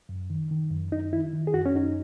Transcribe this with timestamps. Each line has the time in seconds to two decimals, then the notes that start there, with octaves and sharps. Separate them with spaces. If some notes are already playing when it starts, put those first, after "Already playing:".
0.09 F#2
0.30 D#3
0.51 D#3
0.71 F#2
0.91 F#2 D#4
1.13 D#3 E4
1.33 D#3
1.47 G#4
1.54 F#2 F#4
1.66 C#4
1.74 F#2 D#4